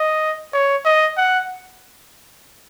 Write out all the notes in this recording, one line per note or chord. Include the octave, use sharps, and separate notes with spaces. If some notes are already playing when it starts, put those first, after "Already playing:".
Already playing: D#5
C#5
D#5
F#5